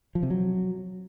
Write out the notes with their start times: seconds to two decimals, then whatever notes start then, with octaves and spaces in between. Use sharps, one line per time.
0.15 F3
0.23 C3
0.30 F#3